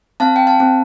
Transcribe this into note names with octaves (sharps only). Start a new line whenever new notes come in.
C4 F5 A5
G5
F5 A5
C4